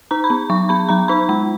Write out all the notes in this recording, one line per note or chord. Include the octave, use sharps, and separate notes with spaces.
D#4 A#5
B5
B3
F#3 C#6
B3 B5
F#3 A#5
D#4 B5
G#3 B5